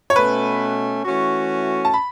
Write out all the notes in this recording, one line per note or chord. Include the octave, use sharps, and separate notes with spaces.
C#5
B2 A3 C#4 B4
E3 A3 C#4 F#4
A5
B5